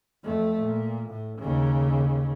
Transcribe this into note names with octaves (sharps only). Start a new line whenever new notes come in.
F2 A3
A#2
A2
D#2 C#3